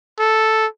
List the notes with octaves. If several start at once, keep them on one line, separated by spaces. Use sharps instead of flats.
A4